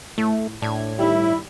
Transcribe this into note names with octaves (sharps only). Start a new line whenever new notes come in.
A2 A3
A2 D4 G#6
G2 D#3 G3 E4